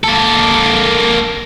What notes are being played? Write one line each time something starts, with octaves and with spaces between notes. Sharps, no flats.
A#3 A4